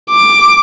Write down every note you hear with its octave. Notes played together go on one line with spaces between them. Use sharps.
D6